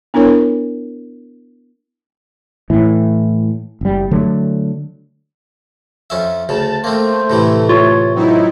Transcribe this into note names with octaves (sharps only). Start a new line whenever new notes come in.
B3 D4 E4 A#4 C#5
A2 E3
F#1 G3
D3 F#3 A3
F2 C#4 E5
D2 C#3 A5
A3 A#3 C4 C5
A2 C3 E3
F4 C#5
F#3 C4 D#4 E4